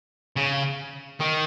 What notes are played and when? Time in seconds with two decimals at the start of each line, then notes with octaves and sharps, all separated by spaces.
0.36 C#3
1.20 D#3